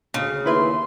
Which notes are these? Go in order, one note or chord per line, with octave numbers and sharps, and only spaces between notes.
D2 C#3
D#2 E4 B4 E5 C6